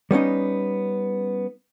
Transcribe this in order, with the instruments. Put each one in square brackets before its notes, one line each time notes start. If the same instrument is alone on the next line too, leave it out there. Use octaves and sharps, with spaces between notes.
[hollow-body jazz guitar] G3 B3 C#4 D#4